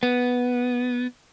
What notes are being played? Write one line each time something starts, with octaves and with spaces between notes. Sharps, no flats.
B3